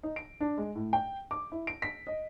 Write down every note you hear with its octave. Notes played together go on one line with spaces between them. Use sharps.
D#4
D7
D4
G#3
A2
G5
D6
E4
D7
B6
D#5